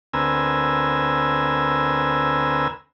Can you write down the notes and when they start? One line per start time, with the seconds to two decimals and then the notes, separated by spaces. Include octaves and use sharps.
0.13 D2 B3 C4 A#4 G#5 E6